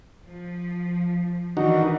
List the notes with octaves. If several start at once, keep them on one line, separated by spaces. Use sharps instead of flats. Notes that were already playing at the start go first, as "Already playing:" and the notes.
F3
G#2 D#3 E3 D4 D#4 F#4